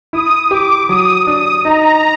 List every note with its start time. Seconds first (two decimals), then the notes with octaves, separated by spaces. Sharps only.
0.13 E4 D#6
0.51 G4 D6
0.89 F#3 D#6
1.27 D4 D#6
1.64 D#4 A#5